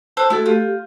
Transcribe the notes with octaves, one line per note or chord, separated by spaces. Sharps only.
A4 C5 F#6
A3 E4 F#4 A4
F4 G4